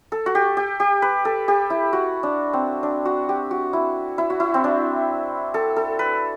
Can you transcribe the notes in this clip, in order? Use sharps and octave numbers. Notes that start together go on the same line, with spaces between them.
A4
F#4
G4
G4
G4
B4
A4
G4
E4
F#4
D4
C4
D4
F#4
G4
F#4
E4
E4
F#4
E4
C4
D4
A4
A4
B4